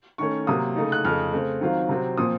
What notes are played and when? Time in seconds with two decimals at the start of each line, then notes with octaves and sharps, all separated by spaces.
0.18 D#3 A3 C#4 C#6
0.47 C3 F#3 A#3 D#6
0.76 C#3 A3 D#4
0.92 F#6
1.05 F2 C#3 A3 F6
1.33 C#3 A3 C4
1.61 D#3 F#3 C4 F4
1.89 C3 F#3 C4
2.17 A#2 F3 C4 D#6